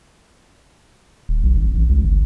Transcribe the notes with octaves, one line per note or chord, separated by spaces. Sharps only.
D#1
B1
G#1
A1
C#2
G1